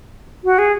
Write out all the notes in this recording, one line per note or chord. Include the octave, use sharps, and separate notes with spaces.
F#4
G#4